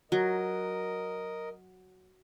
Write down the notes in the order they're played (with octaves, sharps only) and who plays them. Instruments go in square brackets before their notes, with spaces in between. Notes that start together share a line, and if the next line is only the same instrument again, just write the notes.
[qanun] F#3 [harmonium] A#4 D#5